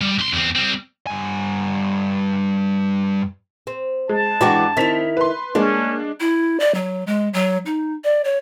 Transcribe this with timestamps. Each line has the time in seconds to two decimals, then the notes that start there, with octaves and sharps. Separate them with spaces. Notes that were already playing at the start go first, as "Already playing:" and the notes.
0.01 G3
0.18 B1 C6
0.33 E2 C4
0.56 G3 C4
1.07 G2 G#5
3.67 C4
4.09 G#3 A5
4.41 G#2 E3 D4 F#4 G4 D6
4.77 D#3 C4 E4 B6 F7
5.17 B4 C6
5.55 G#3 A#3 C#4 D4
6.20 E4
6.60 D5
6.75 F#3
7.07 G#3
7.33 F#3
7.66 D#4
8.04 D5
8.25 C#5